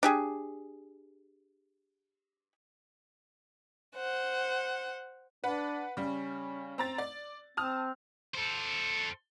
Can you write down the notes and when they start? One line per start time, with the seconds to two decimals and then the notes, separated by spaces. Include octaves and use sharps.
0.03 D4 G4 G#4
3.96 C5 F#5
5.44 D4 B4 F#5
5.97 C#3 G3 C#4
6.78 C4 A#5 A6
6.98 D5 A6
7.57 C4 A5 D#6 F6
8.34 A4 C5